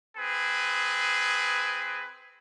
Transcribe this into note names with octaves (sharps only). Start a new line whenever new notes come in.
C4 G#4 B4